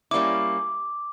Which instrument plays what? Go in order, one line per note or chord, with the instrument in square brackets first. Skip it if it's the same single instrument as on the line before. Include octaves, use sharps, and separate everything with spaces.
[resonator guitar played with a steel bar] G3 A#3 C#4 E4 [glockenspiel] D6